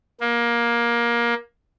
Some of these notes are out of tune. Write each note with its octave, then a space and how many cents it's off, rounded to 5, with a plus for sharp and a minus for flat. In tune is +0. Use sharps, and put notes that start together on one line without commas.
A#3 +20